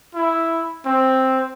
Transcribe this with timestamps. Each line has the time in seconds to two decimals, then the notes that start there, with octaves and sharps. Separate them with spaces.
0.14 E4
0.85 C4